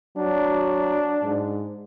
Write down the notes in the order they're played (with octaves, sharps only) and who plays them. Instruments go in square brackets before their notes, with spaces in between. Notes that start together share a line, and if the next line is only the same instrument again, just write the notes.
[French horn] F#3 [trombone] D4
[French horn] G#2